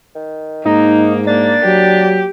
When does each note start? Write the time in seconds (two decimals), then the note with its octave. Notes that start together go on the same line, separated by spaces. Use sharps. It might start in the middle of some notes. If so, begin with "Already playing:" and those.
0.15 D#3
0.66 G#2 A#3 D#4
1.27 A#3 D4 A6
1.65 F#3 G4